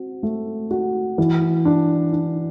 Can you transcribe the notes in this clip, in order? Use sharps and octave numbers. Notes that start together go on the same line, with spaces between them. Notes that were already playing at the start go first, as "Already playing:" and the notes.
Already playing: C4 F#4
A3
F#4
E3
D4
D4